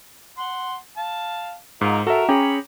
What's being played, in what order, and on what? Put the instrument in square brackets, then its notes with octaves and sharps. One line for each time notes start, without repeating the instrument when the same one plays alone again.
[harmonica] F#5 C6
F5 A5
[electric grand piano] G#2 [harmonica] F4 A#4 D#5
[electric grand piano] F#4 E5 [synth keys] A4 [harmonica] A#4
[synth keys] C#4 G#4 [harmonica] C#5 B5 [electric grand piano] G5 A#5 D6